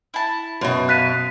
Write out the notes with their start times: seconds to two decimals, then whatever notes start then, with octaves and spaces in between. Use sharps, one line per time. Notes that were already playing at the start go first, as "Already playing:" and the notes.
0.14 E4 A5
0.61 F#2 B2
0.89 F5 A5 F#6 B6 D#7